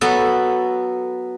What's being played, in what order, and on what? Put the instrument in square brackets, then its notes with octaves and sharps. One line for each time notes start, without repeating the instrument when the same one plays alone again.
[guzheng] F#3 B3 F#4 A4